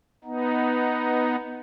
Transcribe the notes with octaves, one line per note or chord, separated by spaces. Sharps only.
B3 D#4